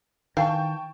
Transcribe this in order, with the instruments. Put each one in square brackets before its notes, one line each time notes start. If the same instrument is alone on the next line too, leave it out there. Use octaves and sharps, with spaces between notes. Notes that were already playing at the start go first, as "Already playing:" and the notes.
[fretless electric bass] D#3 [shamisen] E3 F5 [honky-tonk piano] G5 A5 C#6